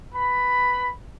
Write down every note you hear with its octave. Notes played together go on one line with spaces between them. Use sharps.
B4 B5